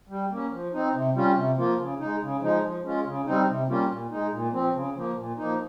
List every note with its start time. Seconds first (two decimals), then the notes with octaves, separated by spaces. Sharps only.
0.09 G3
0.30 A#3 C#4
0.51 F3
0.73 C4 D#4
0.93 C3
1.14 G3 C#4 F4
1.35 C3
1.57 F3 A#3 F4
1.78 C#3
1.99 G#3 D#4
2.20 C#3
2.41 F3 G#3 D#4
2.62 F3
2.84 G#3 C#4 F4
3.05 C#3
3.25 G3 C4 D#4
3.47 C3
3.68 G3 A#3 C#4 F4
3.90 A#2
4.10 G#3 D#4
4.31 A#2
4.52 F3 C4
4.74 C#3
4.95 F3 A#3
5.16 A#2
5.37 F3 A#3 D#4